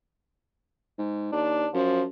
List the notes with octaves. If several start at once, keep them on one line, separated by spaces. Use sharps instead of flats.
G#2
D#2 D4
F#2 F3